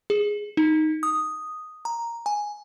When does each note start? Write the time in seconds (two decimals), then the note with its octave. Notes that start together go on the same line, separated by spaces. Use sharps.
0.10 G#4
0.57 D#4
1.03 D#6
1.85 A#5
2.26 G#5